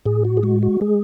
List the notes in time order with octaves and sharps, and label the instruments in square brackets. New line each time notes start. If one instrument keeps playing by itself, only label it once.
[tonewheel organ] A2 G#4
F#4
G#4
G#3 F#4
F#4
G#3 G#4